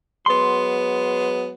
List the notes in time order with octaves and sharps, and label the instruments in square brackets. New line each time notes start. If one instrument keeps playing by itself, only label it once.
[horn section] F#3 G#3 B3 [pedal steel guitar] C6